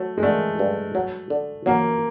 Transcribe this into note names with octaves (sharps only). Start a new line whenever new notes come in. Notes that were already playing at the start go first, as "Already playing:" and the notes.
Already playing: F#3 A3
G#3
D3 A3
G2
F#3
D3
F#3 A#3